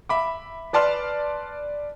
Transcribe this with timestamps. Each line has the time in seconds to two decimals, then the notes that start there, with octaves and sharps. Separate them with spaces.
0.09 E5 B5 D6
0.73 B4 D5 A5 C6 F6